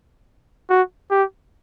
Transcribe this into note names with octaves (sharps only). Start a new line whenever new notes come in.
F#4
G4